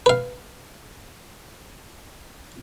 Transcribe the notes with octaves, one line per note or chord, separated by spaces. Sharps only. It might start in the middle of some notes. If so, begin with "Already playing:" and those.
B4 F5